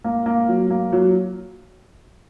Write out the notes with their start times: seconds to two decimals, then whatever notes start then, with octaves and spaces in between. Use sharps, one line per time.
0.04 A#3
0.26 A#3
0.48 F#3
0.70 A#3
0.93 F#3